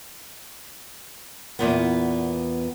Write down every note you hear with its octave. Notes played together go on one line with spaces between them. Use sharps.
E2 A#2 B3